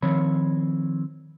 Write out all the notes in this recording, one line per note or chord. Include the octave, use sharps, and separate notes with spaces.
D#3 F3 C4 C#5 B5